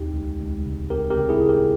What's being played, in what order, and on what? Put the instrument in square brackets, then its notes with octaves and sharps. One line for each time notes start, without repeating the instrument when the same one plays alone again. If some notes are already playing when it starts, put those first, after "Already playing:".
Already playing: [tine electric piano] D#2 D#4 G4
C#2
C#2
C#3
C#2 G4 A#4
G4 A#4
C#3
E4 G#4
C#3
G4 A#4